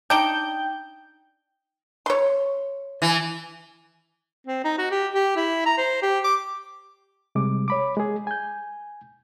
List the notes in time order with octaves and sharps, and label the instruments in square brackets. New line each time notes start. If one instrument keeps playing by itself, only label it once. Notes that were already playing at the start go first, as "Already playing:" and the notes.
[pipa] D4 D#4 [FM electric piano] G5 G6
[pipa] C#5 C6
[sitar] E3
[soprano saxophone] C4
D#4
F#4
G4
G4
E4
A#5
C5
G4
D6
[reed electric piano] C3 G3 G#3 D6
C#5 B5 D6
G#3 G#4
G#5 G6